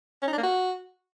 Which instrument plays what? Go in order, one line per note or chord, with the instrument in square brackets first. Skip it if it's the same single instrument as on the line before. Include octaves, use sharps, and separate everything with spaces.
[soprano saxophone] C#4
D#4
D4
A#3
F#4